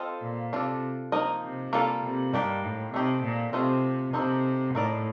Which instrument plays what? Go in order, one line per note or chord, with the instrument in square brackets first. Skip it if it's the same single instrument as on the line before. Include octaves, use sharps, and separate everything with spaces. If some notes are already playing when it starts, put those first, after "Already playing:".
Already playing: [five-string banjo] C4 F4 A4 C5 D#5
[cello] A#2
[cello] C3 [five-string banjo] D4 F4 A4
[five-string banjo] F3 A#3 D#4 A#4 D#5
[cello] C3
[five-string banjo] G3 A#3 F4 A4
[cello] C3
[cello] G2 [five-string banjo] D#3 A#3 D4 G4
[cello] A2
[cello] C3 [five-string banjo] A3 D#4 G4 C5
[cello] A#2
[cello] C3 [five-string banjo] A3 C4 F4 C5 D#5
[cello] C3 [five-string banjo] A#3 D#4 A4 C5
[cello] A2 [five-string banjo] A3 D#4 A#4 D5